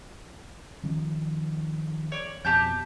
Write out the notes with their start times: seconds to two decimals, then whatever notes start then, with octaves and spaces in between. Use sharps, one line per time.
0.83 D#3 F3 C#4
2.12 C#5 D5
2.45 F2 B2 G4 A5 G6